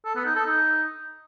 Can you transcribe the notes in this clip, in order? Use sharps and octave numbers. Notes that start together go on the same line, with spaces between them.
A4
B3
D#4
A4
D#4